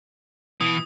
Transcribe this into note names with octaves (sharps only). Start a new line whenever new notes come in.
B2 E3 D#6